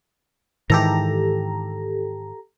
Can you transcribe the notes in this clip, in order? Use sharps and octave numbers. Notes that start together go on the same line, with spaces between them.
G#2 D#3 E3 G4 A4 A#5